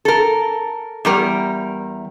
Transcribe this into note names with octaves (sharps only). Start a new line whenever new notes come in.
A4 A#4
E2 G3 A#4